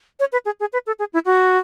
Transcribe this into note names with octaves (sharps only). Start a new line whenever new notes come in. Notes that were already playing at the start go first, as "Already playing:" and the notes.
C#5
B4
G#4
G#4
B4
A4
G#4
E4
F#4